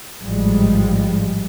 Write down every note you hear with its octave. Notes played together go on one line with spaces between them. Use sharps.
A1 G#2 F3 G3 G#3